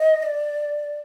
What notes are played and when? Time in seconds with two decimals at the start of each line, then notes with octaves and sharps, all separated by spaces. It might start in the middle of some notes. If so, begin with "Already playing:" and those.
Already playing: D#5
0.23 D5